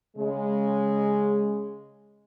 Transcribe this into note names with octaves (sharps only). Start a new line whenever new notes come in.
C#3 G#3